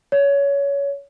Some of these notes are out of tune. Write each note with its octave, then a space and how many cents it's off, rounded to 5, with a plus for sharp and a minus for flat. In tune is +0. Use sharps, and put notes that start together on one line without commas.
C#5 +20